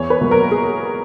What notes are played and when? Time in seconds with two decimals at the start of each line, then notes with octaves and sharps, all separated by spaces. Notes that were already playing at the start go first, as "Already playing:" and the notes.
Already playing: E2 C#5
0.10 B4
0.21 B2 F#3 A#3
0.31 A#4
0.51 G#4